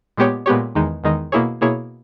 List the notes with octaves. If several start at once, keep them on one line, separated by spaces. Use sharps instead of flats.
A#2 G#3 B3 G4 C#5
A#2 G#3 B3 G4 C#5
E2 D#3 G#3 D#4
E2 D#3 G#3 D#4
B2 A#3 E4 G#4 C#5
B2 A#3 E4 G#4 C#5